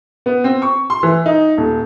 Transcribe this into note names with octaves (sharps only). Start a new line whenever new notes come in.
B3
C4
C#6
C6
E3
D#4
D#1